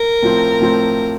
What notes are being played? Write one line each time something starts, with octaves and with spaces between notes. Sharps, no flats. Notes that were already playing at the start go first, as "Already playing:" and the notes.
Already playing: A#4
A2 F3 C4
A2 F3 C4